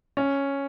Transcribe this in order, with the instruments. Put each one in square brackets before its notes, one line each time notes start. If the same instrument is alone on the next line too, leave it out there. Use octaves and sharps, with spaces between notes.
[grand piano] C#4